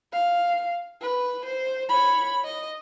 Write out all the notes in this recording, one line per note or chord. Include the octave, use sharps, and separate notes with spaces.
F5
B4
C5
C#5 B5
D#5